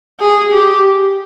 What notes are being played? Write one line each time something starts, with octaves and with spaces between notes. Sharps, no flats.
G#4
G4